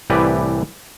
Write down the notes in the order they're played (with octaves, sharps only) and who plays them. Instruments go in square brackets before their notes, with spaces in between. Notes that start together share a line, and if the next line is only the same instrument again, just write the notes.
[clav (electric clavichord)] C2 A2 E3 G4 B4 D5